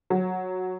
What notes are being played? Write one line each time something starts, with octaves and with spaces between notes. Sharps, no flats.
F#3